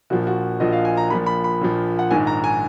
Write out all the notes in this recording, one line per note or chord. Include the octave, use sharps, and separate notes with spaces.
A#1 A#2 F3 F#4
F#4
A#1 A#2 F3 D#5
F5
G#5
A#5
A#1 A#2 F3 B5
B5
B5
A#1 A#2 F3
F#5
A#1 G#2 D#3 G#5
A#5
G#5